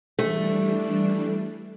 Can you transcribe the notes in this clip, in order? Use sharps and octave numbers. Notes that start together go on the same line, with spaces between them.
E3 G3 A3 D4